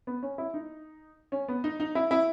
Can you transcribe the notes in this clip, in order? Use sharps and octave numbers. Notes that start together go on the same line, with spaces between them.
B3
C#4
E4
D#4
C#4
B3
D#4
D#4
E4
E4